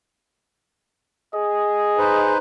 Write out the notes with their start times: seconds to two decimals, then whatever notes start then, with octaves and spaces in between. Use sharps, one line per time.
1.34 G#4 D#5
1.98 D#4 B4 C5